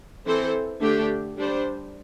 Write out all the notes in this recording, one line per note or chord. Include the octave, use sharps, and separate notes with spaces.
E3 C4 A4 C5
D3 A3 D4 G4
G3 D4 C5